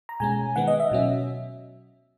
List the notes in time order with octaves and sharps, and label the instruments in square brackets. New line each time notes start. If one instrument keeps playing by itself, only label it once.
[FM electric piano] A#5
B2 G#3 C#4 G#5
D#3 G#3 B3 F#5
D#5
E5
B2 F#3 C#4